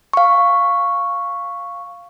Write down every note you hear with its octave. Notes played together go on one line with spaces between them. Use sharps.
F5 C#6